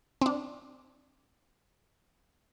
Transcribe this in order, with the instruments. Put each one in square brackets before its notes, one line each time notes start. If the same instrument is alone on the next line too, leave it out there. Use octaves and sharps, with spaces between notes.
[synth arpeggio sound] C4 D4